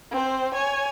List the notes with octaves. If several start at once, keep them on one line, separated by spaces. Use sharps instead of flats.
C4 C5
C#5 G#5